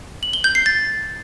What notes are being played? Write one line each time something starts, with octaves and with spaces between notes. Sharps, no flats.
F#7
G7
G6
C7
A6